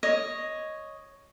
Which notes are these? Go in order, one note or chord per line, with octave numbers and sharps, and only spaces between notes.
C#5 D#5